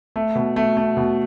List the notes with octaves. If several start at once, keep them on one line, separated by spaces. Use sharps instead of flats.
A3
B2
A3
A3
B2